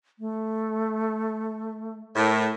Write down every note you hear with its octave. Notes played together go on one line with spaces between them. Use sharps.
A3
A2 A#4